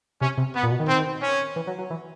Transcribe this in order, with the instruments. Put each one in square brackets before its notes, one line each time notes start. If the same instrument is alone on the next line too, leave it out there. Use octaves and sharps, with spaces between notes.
[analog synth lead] C3 [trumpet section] C#4
[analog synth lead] C3
[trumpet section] B3
[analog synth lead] A#2
B2
D#3
[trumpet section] C4
C#4
[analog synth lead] E3
F#3
F#3
E3